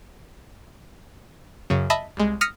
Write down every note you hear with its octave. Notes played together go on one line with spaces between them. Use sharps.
F#2 C#3
D#5 E5 A5 B5
C2 G#3
D#6 F6 A#6 B6 C#7 D#7